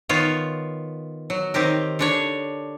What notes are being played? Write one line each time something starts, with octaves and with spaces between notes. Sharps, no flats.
D#3 B3 F4 C#5
F#3
D#3 C4 G4 A#4
D3 D4 C#5